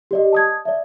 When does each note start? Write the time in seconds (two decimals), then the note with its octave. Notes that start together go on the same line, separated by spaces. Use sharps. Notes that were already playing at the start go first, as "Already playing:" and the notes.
0.11 G4 D5 D#5
0.33 A5 D#6 G#6
0.65 D5 E5